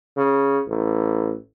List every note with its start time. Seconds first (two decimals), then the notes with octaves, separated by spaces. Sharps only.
0.17 C#3
0.68 A1